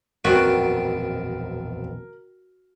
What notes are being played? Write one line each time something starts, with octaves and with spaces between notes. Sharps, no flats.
E1 A#1 F#2 B3 C4 D4 F#4 A#4